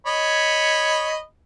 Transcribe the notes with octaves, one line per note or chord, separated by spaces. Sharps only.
C#5 D#5 B5